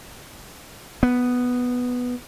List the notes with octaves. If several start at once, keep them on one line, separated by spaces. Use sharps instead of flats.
B3